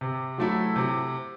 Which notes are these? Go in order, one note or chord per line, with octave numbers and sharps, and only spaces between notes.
C3
F#3 A3 E4
C3